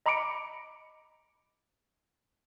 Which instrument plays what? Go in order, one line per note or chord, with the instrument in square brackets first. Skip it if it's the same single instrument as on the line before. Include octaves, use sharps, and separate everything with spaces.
[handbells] D#5 A#5 B5 D6 C#7 D7